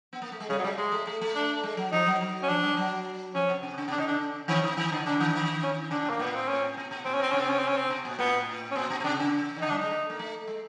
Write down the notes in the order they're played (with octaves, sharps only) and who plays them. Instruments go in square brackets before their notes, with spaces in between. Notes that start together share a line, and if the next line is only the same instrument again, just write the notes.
[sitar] B3
A#3
A3
G#3
[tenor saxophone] C#3 [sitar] G3
[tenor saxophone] F#3
[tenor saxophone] G3 [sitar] G#3
[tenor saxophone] G#3 [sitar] A3
[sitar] A3
A3
A3
[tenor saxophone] D4
[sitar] G#3
F#3
[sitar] F3 [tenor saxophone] D#4
[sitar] F#3
F#3
[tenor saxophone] C#4
[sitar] F3 [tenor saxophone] D4
[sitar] G3
F3
F#3
[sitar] F3 [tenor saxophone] C#4
[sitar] C3
C3
C#3
[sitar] C3 [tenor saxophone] D4
[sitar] C#3 [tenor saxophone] D#4
[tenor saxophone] D4
[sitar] D#3 [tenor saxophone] C#4
[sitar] D#3
D#3
D3
[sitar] C#3 [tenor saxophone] D4
[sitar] D#3
D#3
[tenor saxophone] C#4
[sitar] C#3 [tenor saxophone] D4
[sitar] A2 [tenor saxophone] A#3
[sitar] A2 [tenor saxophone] B3
[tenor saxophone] C4
C#4
[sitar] B2
B2
[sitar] A#2 [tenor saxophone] C4
[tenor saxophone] C#4
[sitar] B2 [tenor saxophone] C4
[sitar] C3 [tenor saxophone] C#4
[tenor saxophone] C4
C#4
C4
C#4
C4
[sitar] B2
A#2
[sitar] A2 [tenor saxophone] B3
[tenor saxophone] C#4
[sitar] A#2 [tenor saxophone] C4
[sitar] B2
B2
[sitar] C3 [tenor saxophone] D4
[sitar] C#3
D#3
[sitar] D3 [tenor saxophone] D#4
[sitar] G3 [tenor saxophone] D4
[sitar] G#3 [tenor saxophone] D#4
[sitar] A3
A#3
A3
G#3